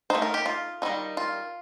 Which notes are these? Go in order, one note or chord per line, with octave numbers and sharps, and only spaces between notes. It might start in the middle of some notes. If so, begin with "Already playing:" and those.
A3 D#4 C5
A#4
G4
F4
D#3 G3 C4 D#4
F4